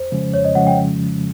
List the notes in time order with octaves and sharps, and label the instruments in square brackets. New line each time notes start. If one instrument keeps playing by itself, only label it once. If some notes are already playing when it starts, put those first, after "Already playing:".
Already playing: [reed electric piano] F2 [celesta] C5
[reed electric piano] C#3 F3 G#3 C#4
[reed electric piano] F2 [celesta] C#5
[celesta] D#5
[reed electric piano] C#3 F3 G#3 C#4 [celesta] F#5
[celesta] G5